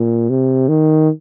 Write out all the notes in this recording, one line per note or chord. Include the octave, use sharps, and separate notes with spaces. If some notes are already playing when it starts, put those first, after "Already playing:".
Already playing: A#2
C3
D#3